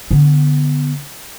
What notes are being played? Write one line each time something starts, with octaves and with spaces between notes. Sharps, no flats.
D3 B3